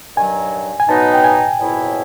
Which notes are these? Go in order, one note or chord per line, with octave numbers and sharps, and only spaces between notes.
G2 D#3 F#3 G#5
G#5
B2 F#3 B3 D#4 A5
G5
G#5
F2 C#3 F#3 B3 E4